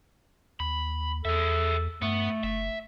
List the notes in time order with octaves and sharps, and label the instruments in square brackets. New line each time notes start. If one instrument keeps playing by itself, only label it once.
[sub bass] D#2 [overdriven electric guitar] B5
[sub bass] E2 [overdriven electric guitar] G#4 E5 [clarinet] A4
[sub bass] G2 [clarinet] A3 [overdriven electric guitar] B3
[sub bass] F#1 [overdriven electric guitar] E5